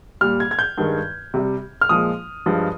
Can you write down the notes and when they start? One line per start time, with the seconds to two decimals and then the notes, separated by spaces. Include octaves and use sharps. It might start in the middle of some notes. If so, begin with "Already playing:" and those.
0.21 A#2 G3 F6
0.40 G#6
0.51 G#6
0.59 G6
0.77 G2 D#3 G#3
1.34 C3 G3
1.81 F6
1.89 A#2 F3 G#3 D#6
2.46 G2 F3 G#3